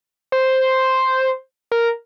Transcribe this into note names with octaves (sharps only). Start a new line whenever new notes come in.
C5
A#4